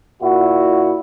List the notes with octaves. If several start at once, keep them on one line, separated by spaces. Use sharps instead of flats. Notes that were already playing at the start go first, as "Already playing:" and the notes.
A#2 E4 F#4